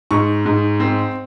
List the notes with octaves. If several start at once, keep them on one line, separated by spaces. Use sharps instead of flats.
G#2 C#6
G#2
C4